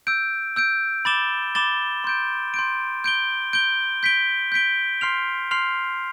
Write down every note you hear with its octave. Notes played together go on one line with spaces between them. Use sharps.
E6 G6 D7
E6 G6 D7
B5 D6 A6 E7 G7
B5 D6 A6 E7 G7
C6 G6 D7
C6 G6 D7
G6 D7 G7
G6 D7 G7
G6 B6 D7 G7
G6 B6 D7 G7
C6 F6 C7 F7
C6 F6 C7 F7